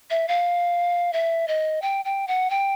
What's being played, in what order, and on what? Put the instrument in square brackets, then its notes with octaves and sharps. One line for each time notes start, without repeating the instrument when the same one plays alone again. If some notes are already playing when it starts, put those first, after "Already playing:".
[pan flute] E5
F5
E5
D#5
G5
G5
F#5
G5